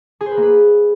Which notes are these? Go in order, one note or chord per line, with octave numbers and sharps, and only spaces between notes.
G#4
C5
B4
A#3
B4